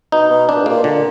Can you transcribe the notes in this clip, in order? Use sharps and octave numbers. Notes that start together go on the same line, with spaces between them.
B2 D#4
B2
B2 D4
A#2
G#2
A#2 A#3
A#2 D3